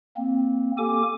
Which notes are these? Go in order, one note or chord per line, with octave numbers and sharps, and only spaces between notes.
A#3 C4
A#3 G4 A4 G#5 D6